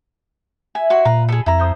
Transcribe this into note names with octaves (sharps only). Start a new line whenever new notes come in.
E4 G#5
F#4 C#5 C6
A#2 B4 F5 A#5
G#4 A4 B4 D#5
F2 E4 A#5
A3 C5 D#6